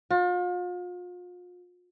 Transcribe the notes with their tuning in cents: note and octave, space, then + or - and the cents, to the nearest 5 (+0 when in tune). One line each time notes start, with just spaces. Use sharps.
F4 +40